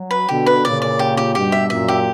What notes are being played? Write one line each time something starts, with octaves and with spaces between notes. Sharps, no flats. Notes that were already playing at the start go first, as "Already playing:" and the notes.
Already playing: F#3
B4
B2 D3 G4
B4
A#2 C#3 D5
D5
G4
G4
G2 B2 G4
E5
F#2 A#2 E5
G4